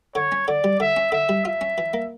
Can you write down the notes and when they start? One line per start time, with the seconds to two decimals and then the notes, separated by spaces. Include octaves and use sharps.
0.15 D3 C#5
0.32 C#4
0.47 D3 D5
0.64 G3
0.80 D3 E5
0.97 C#4
1.12 D3 E5
1.29 G3
1.45 F4 E5
1.61 C#4
1.78 E3
1.94 A#3